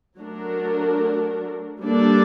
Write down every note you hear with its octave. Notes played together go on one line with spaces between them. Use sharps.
F#3 A3 D4 F#4 A#4
G3 A#3 D4 A4 D5